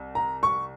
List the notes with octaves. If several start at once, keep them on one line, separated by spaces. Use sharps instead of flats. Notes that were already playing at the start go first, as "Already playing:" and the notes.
Already playing: C2
A#5
C#6